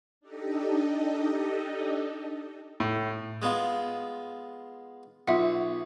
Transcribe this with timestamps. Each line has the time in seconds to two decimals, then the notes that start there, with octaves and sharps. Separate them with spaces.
0.21 D4 D#4 G4 A4 D#5
2.80 A2
3.42 G#3 B3 F4
5.28 B1 F4 E5 F#5